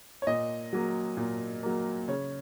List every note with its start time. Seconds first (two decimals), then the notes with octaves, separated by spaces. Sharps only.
0.22 C#5
0.27 A#2 D#5
0.73 F#3 A#3
1.17 A#2
1.63 F#3 A#3
2.08 C#3 C#5